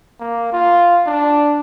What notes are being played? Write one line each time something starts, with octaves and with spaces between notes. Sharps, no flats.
A#3
F4
D4